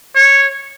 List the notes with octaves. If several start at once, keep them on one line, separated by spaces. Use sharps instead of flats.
C#5